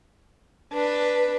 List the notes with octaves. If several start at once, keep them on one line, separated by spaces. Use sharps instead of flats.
D4 B4